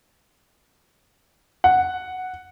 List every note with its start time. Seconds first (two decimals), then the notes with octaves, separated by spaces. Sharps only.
1.64 F#5